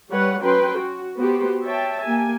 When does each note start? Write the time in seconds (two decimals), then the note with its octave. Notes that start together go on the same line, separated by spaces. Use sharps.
0.11 G3 B4 C#5 F#5
0.42 F#3 C#4 B4 G5 C6
0.78 F#4
1.19 B3 F#4 G4 C5
1.64 C#5 E5 G5 A5
2.04 A#3 G4 G#5